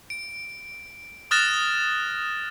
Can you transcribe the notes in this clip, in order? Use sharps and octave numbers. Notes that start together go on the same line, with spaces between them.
D7
D#6 F6 F#6 A6 A#6 E7